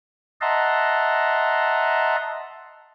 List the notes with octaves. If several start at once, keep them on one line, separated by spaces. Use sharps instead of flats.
D#5 E5 F#5 A5 A#5 C6